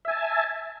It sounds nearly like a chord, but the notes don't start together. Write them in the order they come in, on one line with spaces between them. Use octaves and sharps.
E5 G#5 A5